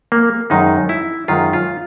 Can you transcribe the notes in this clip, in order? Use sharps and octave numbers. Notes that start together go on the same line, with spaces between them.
A#3
F#2 D#3 G#3 D#4
E4
F#2 D#3 G#3 F4
F4